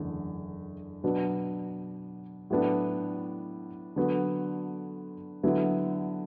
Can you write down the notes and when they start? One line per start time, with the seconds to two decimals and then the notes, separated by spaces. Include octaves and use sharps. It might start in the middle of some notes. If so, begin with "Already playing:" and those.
Already playing: F#1 E2 D3 A3
1.04 B2 F#3 B3 D4
2.50 A2 F#3 B3 D4
3.96 D3 F#3 B3 F#4
5.43 D3 F#3 B3 E4